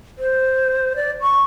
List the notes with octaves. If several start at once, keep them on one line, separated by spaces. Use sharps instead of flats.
C5
D5
C#6